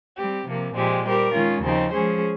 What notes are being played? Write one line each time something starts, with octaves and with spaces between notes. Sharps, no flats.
G3 C4 G4
C3 F3 A#3
A#2 F3 G#3 C4 G4
G3 C4 G4 A#4
D#3 G#3 C#4 F4
D#2 C#3 F3 C4 D#4
F3 G#3 C#4 G#4 C5